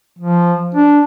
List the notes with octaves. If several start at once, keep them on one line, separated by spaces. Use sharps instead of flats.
F3
D4